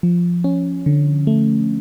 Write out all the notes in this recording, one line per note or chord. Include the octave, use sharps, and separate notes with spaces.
F3
C#4
D3
A3